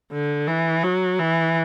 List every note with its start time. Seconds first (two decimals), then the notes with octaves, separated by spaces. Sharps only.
0.12 D3
0.47 E3
0.83 F#3
1.19 E3